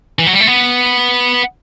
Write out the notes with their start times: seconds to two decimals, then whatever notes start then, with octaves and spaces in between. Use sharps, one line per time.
0.19 E3
0.26 F#3
0.33 G3
0.41 A3
0.47 B3